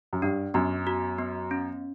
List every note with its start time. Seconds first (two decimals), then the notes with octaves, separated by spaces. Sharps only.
0.13 F#2
0.22 G2 D4
0.54 F#2 B3
0.87 F#4
1.18 B3
1.51 C#4